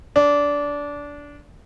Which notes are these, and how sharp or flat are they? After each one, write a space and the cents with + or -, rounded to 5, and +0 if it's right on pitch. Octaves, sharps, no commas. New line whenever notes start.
D4 -20